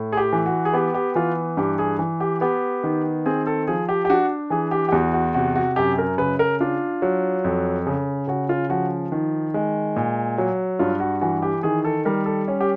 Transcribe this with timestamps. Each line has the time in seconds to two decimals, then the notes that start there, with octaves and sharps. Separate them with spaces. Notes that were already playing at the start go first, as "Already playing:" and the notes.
Already playing: A2
0.12 G#4
0.17 G4
0.33 E3
0.46 F#4
0.65 G#4
0.73 B3 G4
0.94 G4
1.15 E3 F4
1.57 G2 G4
1.78 G#4
1.99 E3
2.20 G4
2.41 B3 G4
2.84 D#3
3.26 C4 G#4
3.47 A4
3.67 F3 G#4
3.89 G4
4.05 G4
4.09 D4 F#4
4.50 E3 G#4
4.71 G4
4.89 G4
4.92 E2 F#4
5.13 F#4
5.34 C3 F#4
5.55 F#4
5.76 F#2 G4
5.98 A#4
6.18 C#3 B4
6.39 A#4
6.60 D4 F4
7.02 F#3
7.44 F2
7.87 C#3
8.28 C#3 F#4
8.49 F4
8.69 F3 F#4
9.12 D#3
9.54 G#3
9.96 A#2
10.38 F#3
10.79 G2 F4
11.00 F#4
11.21 E3 F#4
11.42 G4
11.63 D#3 G#4
11.85 A4
12.05 G3 A#4
12.26 A4
12.48 C#4
12.61 G4